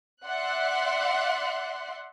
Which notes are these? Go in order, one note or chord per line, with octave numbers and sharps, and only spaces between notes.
D5 E5 F#5 C6 F#6